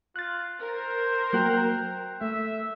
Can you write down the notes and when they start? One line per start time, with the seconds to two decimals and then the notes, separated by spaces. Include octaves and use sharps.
0.16 F4 F#6 A6
0.60 A#4 C5
1.33 F#3 A#3 F#4 G5 F#6 G6
2.21 A3 E5